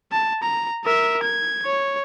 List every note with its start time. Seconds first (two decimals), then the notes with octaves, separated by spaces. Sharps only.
0.12 A5
0.43 A#5
0.84 A#4 E5
1.23 G#6
1.65 C#5